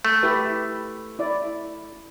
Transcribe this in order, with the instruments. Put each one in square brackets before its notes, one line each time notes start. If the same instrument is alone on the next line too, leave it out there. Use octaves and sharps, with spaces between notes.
[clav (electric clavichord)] A3
[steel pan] E4 G4 B4
E4 D5